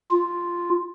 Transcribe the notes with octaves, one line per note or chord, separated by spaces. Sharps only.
F4